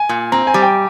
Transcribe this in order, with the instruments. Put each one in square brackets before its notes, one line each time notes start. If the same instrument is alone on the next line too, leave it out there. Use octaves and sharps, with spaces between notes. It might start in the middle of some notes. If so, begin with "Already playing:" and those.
Already playing: [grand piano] G#5
[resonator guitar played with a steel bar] A#2
[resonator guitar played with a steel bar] C4 [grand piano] A#5
[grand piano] G#5
[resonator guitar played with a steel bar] G3
[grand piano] G5